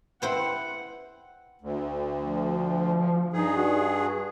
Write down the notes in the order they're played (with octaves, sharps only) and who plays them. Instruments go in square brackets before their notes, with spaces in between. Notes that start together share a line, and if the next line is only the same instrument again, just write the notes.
[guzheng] E4 C5 G5 [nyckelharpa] F#5
[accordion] D2
[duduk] F3
[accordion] G2 G#4 [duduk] D#4
[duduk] F#4